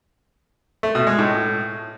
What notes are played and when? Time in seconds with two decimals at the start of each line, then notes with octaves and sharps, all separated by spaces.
0.83 A3
0.95 B2
1.07 G#3
1.19 A2